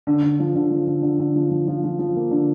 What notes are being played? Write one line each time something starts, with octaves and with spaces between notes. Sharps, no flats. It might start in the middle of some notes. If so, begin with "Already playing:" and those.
D3
D3
F3
D3
F3
D3
D3
D3
F3
F3
F3
F3
F3
A#3
D3